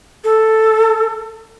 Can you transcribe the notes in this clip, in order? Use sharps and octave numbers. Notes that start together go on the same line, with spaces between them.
A4